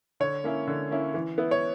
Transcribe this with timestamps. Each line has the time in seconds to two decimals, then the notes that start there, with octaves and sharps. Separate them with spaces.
0.20 D3 C#5
0.44 A#3 C#4 E4
0.67 D3
0.91 A#3 C#4 E4
1.14 E3
1.38 B3 E4
1.51 C#5